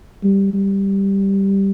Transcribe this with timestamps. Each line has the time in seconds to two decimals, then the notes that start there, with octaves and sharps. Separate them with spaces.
0.24 G3
0.54 G3